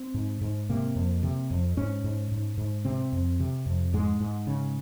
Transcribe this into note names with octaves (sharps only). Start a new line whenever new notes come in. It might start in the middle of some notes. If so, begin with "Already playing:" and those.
Already playing: C4
G#2
G#2
C3 A#3
F2
C3
F2
G#2 C#4
G#2
G#2
G#2
C3 C4
F2
C3
F2
G#2 G#3
G#2
C#3